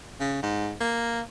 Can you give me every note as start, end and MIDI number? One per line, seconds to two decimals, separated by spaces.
0.20 0.40 49
0.43 0.72 44
0.81 1.21 58